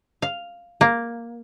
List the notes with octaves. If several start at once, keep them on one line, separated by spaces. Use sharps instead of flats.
F5
A#3